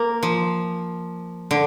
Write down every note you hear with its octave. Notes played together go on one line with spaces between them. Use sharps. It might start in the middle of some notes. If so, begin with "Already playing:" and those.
Already playing: A#3
F3
D3